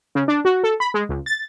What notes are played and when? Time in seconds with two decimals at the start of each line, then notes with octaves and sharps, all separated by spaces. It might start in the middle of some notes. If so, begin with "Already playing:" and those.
0.15 C#3
0.28 D4
0.45 F#4
0.63 A4
0.80 B5
0.94 G#3
1.09 C#2
1.26 A6